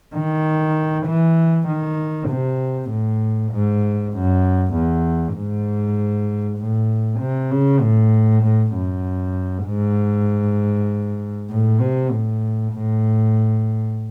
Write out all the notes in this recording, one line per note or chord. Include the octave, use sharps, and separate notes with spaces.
D#3
E3
D#3
C3
A2
G#2
F#2
E2
G#2
A2
C3
C#3
A2
A2
F#2
G#2
A2
C3
A2
A2